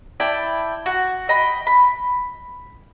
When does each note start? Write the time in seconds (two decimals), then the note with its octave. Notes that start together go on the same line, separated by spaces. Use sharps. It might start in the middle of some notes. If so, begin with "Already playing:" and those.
0.20 E4 D5 G5 A5
0.86 F#4
1.29 D#5 G5 B5
1.67 B5